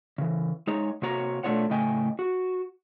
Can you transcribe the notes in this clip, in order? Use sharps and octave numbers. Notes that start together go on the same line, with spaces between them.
C#3 E3
G#3 D#4 C#5 A#5
C3 A#3 F#4 C#5 A#5
B2 A3 D4 F4 C#5 F#5
A2 C#3 A3 D#5 G5 G#5
F#4